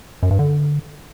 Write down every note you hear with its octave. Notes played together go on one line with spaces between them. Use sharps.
F#2
G2
D3